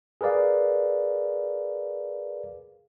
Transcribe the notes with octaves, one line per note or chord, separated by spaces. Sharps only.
G#4 A#4 B4 D5 F5